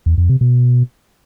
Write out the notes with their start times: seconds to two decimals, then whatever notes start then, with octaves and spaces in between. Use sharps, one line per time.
0.06 E2
0.18 F2
0.29 C3
0.41 B2